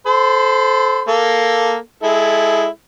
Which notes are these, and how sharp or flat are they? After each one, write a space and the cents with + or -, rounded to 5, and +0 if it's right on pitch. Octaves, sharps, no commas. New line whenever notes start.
A4 -15 C5 +0 B5 +45
A#3 +0 A4 +0
G#3 -5 E4 +0 A4 -25